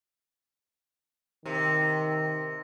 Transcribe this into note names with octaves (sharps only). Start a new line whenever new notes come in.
C3 D#3